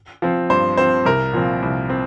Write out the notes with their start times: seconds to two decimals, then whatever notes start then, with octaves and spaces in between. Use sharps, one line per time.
0.22 F3 C4
0.50 G2 C5
0.77 F3 C4 C5
1.05 C2 A#4
1.33 A#2 F3 C4
1.62 C2
1.90 C4